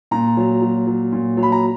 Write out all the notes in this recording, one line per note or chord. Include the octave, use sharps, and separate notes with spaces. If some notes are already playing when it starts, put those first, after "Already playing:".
A#2 A#5
F#3
F#3
F#3
A#2
F#3
B5
A#5